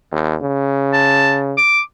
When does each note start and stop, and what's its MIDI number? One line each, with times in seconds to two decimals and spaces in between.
0.12 0.37 39
0.42 1.56 49
0.93 1.38 81
1.57 1.81 86